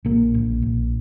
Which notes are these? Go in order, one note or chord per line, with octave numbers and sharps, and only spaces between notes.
A#1 A#3
A#1
A#1